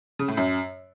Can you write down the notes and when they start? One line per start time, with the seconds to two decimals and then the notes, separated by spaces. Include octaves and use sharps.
0.19 C#3
0.28 A2
0.37 F#2